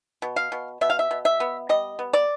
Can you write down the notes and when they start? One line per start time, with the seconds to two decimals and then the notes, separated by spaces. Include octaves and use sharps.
0.22 B2
0.36 F5
0.52 B2
0.81 B2 E5
0.90 F5
0.99 E5
1.11 B2
1.25 E5
1.40 B3
1.69 G3 D#5
1.99 B3
2.13 D5